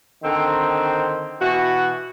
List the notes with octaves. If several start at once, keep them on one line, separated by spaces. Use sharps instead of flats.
D3 D#3 C4
B2 E3 F#4